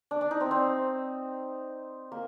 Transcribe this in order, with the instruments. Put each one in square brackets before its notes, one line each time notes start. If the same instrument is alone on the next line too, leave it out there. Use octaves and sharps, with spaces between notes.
[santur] D4
D4
D#4
C4
C4
A#3